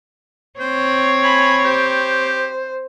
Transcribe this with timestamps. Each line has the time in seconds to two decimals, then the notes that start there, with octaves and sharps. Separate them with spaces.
0.60 C4 C5 C#5
1.24 G#5 B5
1.65 G4 C5